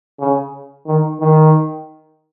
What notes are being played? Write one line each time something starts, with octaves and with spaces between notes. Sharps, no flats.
C#3
D#3
D#3